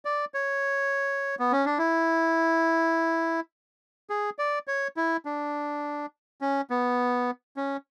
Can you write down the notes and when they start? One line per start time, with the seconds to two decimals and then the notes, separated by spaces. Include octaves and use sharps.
0.05 D5
0.34 C#5
1.39 B3
1.52 C#4
1.65 D4
1.78 E4
4.10 G#4
4.39 D5
4.67 C#5
4.97 E4
5.25 D4
6.41 C#4
6.70 B3
7.57 C#4